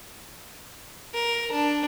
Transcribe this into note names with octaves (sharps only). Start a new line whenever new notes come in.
A#4
D4